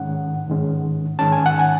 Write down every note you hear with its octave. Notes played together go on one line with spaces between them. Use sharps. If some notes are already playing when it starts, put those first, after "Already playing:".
Already playing: G#2 D#3 G#3 C#4 F#5
G#2 D#3 G#3 C#4
G#2 D#3 G#3 C#4 A5
G#5
F#5
G#5